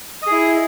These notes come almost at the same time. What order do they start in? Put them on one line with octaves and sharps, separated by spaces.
D#5 G#4 E4